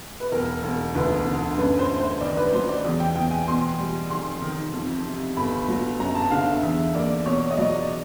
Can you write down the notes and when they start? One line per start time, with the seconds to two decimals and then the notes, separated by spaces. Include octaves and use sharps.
0.20 B4
0.32 E1 A#4
0.63 E1
0.95 D2 B4
1.27 D3
1.58 F#2 B4
1.79 C5
1.89 A3
2.00 C5
2.21 D#3 D5
2.37 B4
2.53 F#3 C5
2.69 D5
2.85 E2
3.00 G5
3.15 E2 G5
3.31 G#5
3.47 B2 C6
3.79 G3
4.10 F1 C6
4.42 D#3
4.74 F2
5.05 C3
5.37 G1 B5
5.68 F#3
5.99 F#2 A#5
6.15 A5
6.31 D3 F5
6.47 E5
6.63 E2 E5
6.95 A#3 D5
7.26 B2 C#5
7.51 D#5
7.57 F#3 D5